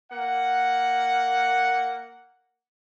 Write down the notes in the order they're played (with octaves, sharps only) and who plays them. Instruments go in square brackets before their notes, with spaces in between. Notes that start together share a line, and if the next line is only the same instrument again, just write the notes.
[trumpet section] A#3 F#5